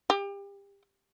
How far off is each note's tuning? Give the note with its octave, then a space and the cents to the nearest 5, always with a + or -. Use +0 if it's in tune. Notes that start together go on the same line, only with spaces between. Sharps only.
G4 +30